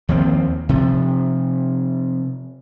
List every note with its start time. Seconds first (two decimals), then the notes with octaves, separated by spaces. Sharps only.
0.09 D#2 F3 A#3 C4
0.69 C3 F3